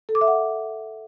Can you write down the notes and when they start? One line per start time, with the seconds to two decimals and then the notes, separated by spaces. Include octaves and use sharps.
0.09 A4
0.15 D6
0.21 E5
0.28 F#5